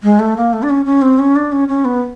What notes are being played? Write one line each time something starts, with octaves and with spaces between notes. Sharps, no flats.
G#3
A3
A#3
A3
D4
C#4
C#4
C4
C#4
D4
C#4
C#4
B3